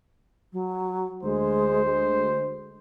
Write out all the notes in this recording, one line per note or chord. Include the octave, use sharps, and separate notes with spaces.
F#3
D2 G#3 C5
G#3